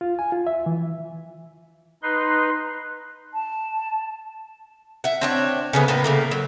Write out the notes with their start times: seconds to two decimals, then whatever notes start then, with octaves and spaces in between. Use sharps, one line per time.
0.01 F4
0.19 G#5
0.32 F4
0.47 E5
0.66 E3
2.03 D#4 B4 C6
3.34 A5
5.04 E5 F#5
5.21 C4 D4 C#5
5.73 C#3 A3 B3
5.88 A2 A#3 B3
6.04 C#3 A3 A#3
6.31 F#3